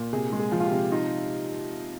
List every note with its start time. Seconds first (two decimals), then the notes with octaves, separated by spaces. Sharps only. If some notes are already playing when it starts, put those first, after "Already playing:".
Already playing: A#2
0.13 C3 G#4
0.32 G#3
0.39 G#4
0.52 F3
0.60 F4
0.66 G4
0.72 C3
0.92 D#4 F4